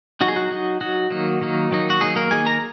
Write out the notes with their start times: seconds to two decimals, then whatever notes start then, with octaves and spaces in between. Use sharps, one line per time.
0.21 F#3 D#4 F#4
0.28 G#4
0.36 F#4
0.51 F#3 D#4
0.81 F#3 D#4 F#4
1.10 D#3 F#3 A#3 D#4
1.41 D#3 F#3 A#3 D#4
1.71 D#3 F#3 A#3 D#4
1.90 F#4
2.01 D#3 F#3 A#3 D#4 G#4
2.16 A#3 A#4
2.31 D#3 A#3 D#4 G#4 G#5
2.46 A#4 A#5